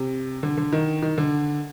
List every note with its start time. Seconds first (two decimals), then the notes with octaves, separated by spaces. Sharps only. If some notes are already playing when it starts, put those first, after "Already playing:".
Already playing: C3
0.43 D3
0.58 D3
0.73 D#3
1.02 D#3
1.18 D3